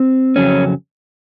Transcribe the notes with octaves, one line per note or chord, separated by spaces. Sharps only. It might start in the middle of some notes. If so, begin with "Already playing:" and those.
Already playing: C4
F2 C#3 F#3 C#4